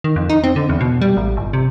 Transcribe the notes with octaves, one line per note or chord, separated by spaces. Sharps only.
D#3
F2
D#4
C4
D3
E2
B2
G3
A1
G1
C3